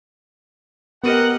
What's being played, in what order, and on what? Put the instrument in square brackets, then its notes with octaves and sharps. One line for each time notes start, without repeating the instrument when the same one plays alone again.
[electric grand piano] B3 D#7 [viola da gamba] G4 D#5 [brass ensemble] A#4 F#5